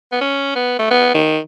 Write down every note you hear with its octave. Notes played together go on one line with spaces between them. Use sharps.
B3
C#4
B3
A3
B3
D#3